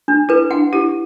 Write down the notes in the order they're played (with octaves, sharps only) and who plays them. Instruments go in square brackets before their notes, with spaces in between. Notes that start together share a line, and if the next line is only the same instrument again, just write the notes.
[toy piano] D4
[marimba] E4 [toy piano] B4
[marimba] D4 [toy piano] F#5
[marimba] E4 [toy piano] G4